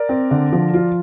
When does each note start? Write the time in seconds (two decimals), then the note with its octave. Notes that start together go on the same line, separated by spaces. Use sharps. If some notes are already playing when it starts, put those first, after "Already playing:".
Already playing: A#4 D5
0.09 C4
0.31 D3
0.53 F3
0.74 F4